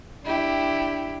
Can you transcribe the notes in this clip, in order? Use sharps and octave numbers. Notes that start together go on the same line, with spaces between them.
D4 E4 G4